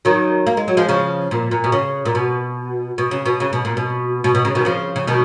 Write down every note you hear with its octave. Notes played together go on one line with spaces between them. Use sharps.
D#3 F#3
A#3
G#3
F#3
F3 G#3
C#3 F3
A#2
A#2
B2
C#3
A#2
B2
B2
C#3
B2
C#3
B2
A#2
B2
B2
B2
C#3
B2 D#3
C#3 F3
C#3
B2 D#3